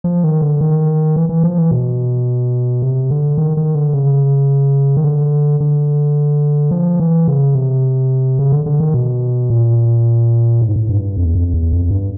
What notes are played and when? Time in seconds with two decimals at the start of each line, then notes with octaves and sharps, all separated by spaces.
0.04 F3
0.24 D#3
0.42 D3
0.61 D#3
1.16 E3
1.29 E3
1.43 F3
1.58 E3
1.71 B2
2.82 C3
3.11 D3
3.38 D#3
3.57 D#3
3.75 D3
3.93 C#3
4.97 D#3
5.04 D3
5.60 D3
6.71 F3
7.00 E3
7.28 C#3
7.55 C3
8.39 C#3
8.52 D3
8.66 D3
8.80 D#3
8.94 B2
9.50 A#2
10.61 A2
10.69 G#2
10.76 A2
10.89 G2
11.17 F2
11.26 E2
11.35 F2
11.54 E2
11.73 F2
11.91 G2